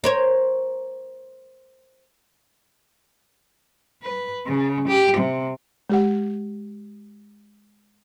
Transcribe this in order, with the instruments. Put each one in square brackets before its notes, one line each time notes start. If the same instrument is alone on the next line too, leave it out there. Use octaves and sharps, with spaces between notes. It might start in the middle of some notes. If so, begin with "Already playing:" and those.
[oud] A#4 C5 C#5
[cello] B4
C#3
G4
C3
[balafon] G#3 G4 F#5